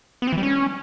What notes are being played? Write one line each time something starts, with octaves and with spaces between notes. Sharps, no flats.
B3
C4
E3
G3
C#4